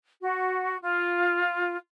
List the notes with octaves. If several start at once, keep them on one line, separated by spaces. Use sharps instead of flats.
F#4
F4